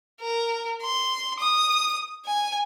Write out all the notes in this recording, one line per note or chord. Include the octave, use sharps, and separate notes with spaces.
A#4
C6
D#6
G#5